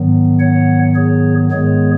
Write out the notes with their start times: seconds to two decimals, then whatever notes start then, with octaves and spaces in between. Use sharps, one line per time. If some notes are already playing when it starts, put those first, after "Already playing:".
Already playing: G#2 D#3 F#3 B3
0.40 C#5 F#5
0.95 G#4 C#5
1.51 G#2 D#3 G#3 B3 G#4 C#5